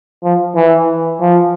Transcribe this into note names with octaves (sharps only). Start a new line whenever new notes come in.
F3
E3
F3